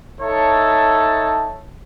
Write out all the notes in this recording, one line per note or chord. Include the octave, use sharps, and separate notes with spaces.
D#4 A4 C#5 E5 A5